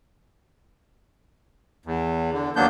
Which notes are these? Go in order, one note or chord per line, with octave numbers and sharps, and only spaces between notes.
E2
D3
D#2 F#3 A#3 B3 D4 G6